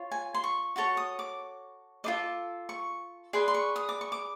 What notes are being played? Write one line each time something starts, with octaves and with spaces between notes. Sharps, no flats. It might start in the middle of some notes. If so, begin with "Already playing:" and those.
Already playing: F4 C#5
G#5
C6
C#6
F#4 A4 C#5 C#6
D#6
D6
F4 A4 C5 D#5 D6
C#6
G#4 B4 D5 C6
C6
C#6
D#6
D6
C#6
D6